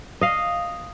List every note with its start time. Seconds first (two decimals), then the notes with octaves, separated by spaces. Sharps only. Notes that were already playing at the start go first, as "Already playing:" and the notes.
0.21 D#5 F5